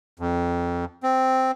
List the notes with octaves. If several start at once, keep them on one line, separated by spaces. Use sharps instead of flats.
F2
C4